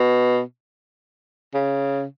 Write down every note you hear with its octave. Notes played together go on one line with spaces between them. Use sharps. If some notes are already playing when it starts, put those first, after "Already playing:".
Already playing: B2
C#3